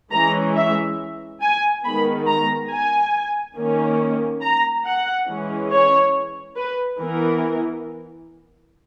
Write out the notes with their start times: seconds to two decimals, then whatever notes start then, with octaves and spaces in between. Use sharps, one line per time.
0.12 E3 G#3 C#4 A#5
0.56 E5
1.42 G#5
1.84 D#3 G#3 B3 B5
2.27 A#5
2.70 G#5
3.56 D#3 A#3 C#4
4.42 A#5
4.85 F#5
5.28 E3 G#3 C#4
5.71 C#5
6.56 B4
6.99 E3 B3 A#4